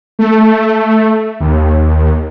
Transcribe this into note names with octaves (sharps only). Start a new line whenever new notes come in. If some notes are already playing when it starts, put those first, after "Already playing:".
A3
D#2